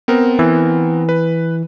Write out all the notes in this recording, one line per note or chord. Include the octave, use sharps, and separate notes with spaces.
B3 C4 A#4
E3
B4